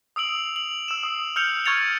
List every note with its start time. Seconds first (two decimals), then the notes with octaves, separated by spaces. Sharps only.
0.16 D#6 E6 D7 F#7
0.56 F#7
0.88 E6 E7
1.03 D#6
1.36 E6 F6 G6 C#7 F7
1.66 C#6 F6 G#6 A6 C#7 F7